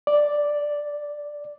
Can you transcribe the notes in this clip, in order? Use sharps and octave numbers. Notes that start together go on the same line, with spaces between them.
D5